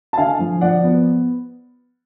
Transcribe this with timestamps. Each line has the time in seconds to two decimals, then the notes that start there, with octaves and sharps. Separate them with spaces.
0.13 A5
0.17 D3 F5 G#5
0.39 F3
0.61 F3 D5 F#5
0.83 B3